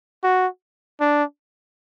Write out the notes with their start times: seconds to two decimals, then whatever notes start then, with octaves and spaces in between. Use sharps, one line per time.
0.23 F#4
1.00 D4